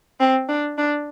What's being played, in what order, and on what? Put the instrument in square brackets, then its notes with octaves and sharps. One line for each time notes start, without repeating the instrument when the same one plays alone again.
[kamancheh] C4
D4
D4